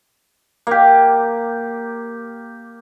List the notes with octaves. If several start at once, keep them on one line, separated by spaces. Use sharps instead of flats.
A#3 G4